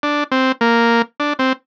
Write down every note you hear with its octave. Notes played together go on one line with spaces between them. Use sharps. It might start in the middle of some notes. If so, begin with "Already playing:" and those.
D4
C4
A#3
D4
C4